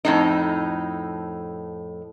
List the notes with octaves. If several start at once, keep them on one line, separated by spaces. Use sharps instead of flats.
F2 A2 D#4